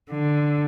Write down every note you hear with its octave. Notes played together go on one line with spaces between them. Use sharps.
D3